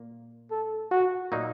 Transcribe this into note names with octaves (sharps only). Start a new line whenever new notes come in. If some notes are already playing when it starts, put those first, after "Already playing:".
Already playing: A#2 A#3
A4
F#4
A#2 F#3 A#3 D#4